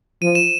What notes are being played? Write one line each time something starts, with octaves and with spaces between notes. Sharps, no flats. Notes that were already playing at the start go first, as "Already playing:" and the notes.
F3 D#7
E7